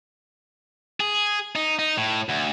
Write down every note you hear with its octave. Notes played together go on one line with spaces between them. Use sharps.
G#4
D#4
D#4
A2
D2